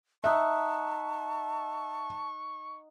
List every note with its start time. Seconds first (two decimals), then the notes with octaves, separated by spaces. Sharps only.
0.24 D#4 E5 F#5 A5 C#6